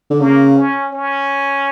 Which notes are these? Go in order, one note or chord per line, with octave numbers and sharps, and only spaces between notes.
D3
C#3 A#3
C#4
C#4